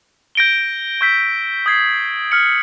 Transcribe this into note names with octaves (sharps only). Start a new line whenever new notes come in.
G6 A#6 D7 G7
C#6 E6 G6 B6
D#6 G#6 C7
F6 G#6 C#7 F#7